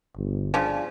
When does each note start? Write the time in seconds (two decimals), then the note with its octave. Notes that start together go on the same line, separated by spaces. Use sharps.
0.17 G1
0.54 C#3 F3 D4